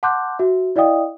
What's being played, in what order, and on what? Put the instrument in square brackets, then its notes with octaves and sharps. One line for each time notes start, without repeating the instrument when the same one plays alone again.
[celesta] F#5 A5 C6 D6 F#6 G6
F#4 E5
E4 D5 D#5 F5 G5 D#6